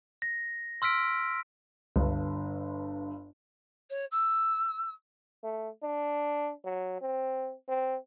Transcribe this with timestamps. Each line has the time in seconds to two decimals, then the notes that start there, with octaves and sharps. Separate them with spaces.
0.22 A#6
0.82 C6 E6 F6 B6 D7
1.96 G1 C#2 G2
3.90 C#5
4.11 E6
5.43 A3
5.83 D4
6.65 F#3
7.01 C4
7.68 C4